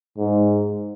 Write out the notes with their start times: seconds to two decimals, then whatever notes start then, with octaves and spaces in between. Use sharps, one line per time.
0.18 G#2